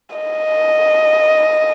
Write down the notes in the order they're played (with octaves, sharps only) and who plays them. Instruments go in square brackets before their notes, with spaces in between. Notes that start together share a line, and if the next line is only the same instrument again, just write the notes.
[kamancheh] D#5